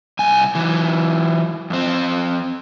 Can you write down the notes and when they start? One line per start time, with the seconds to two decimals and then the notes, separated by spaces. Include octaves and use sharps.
0.19 C2 G#5
0.55 E3 F#3
1.70 F2 C4